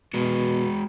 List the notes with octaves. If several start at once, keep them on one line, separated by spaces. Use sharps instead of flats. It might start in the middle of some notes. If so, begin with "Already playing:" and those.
B2 G#3 F#4 G#4